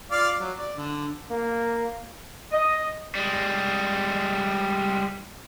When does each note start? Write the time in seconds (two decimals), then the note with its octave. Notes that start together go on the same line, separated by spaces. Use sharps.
0.11 F4 D5 F5
0.40 F#3
0.57 D5
0.77 D3
1.31 A#3
2.52 D#5
3.15 G3 G#3